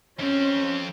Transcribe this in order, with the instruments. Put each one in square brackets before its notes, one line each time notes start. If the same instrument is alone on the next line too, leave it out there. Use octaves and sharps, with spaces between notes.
[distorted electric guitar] F2 C4 [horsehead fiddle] C#4